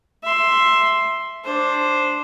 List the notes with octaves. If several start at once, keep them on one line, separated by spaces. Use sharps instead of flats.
E5 C6
D4 C5